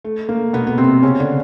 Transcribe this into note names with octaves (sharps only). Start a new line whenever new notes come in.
A3
A#3
B2 B3
B3
C3 C4
C#3 C#4
D3 D4